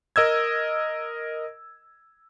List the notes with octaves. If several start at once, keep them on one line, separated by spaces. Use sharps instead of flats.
A#4 D#5 E6 G#6